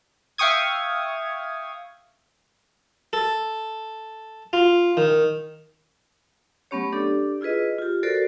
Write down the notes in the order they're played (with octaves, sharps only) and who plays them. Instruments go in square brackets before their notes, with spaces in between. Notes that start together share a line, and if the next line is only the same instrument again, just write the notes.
[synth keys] E5 F5 G5 C#6 D#6 G#6
[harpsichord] A4
F4
D#3
[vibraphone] F#3 A3 B3 C#4 G4 C#5
D4 G4 A4 D5
E4 F4 G#4 B4 D#5
F4 G4
F#4 A4 A#4 C5 D5